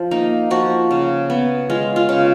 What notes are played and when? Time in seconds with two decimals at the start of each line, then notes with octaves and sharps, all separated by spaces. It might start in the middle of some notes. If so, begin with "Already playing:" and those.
Already playing: F3
0.11 A#3 D#4
0.50 F3 F#4
0.91 C#3
1.30 B3
1.70 G#3 F4
1.96 F4
2.09 C#3